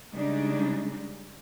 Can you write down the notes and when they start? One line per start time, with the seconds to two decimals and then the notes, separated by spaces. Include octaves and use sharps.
0.13 C#3 G3 G#3 D4 D#4